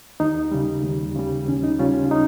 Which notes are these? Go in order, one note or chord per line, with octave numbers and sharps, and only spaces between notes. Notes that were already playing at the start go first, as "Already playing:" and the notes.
D#2 D#4
C#3 G3
D#2
C#3 G3
D#2 C#4
D#4
C#3 G3 C#4 F4
D#4